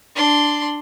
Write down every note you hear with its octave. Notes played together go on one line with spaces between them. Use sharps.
D4 C6